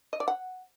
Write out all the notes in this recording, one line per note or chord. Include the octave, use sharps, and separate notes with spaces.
D#5
D5
F#5